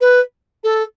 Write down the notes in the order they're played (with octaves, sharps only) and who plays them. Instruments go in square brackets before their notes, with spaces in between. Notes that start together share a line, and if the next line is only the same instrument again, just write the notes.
[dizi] B4
A4